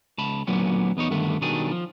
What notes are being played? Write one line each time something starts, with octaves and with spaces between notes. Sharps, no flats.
C#2 A5 B5
D2 A#2 D3 F#3 B3 C#4
E2 B3 D#4 C#5
G2 D3 D#3 A3 B3
B1 D#3 F#3 G3 D4 G#4
F3